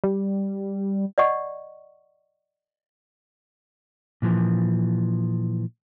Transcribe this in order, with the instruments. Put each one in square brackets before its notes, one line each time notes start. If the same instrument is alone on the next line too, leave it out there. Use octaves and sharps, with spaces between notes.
[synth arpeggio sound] G3
[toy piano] D5 D#5 F#5 C#6
[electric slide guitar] A#2 E3 F3